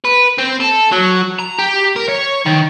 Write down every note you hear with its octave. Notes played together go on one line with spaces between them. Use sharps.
B4
C4
A4
F#3
A#5
G4
A#4
C#5
D#3